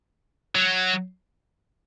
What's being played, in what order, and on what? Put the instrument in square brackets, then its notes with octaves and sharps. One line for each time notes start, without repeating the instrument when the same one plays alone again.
[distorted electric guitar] F#3